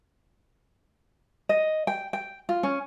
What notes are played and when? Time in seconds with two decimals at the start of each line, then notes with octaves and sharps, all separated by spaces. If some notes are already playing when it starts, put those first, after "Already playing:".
1.49 D#5
1.87 G5
2.13 G5
2.49 F4
2.63 C#4